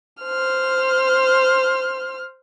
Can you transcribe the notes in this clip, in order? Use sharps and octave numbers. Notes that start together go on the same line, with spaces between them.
C5 F6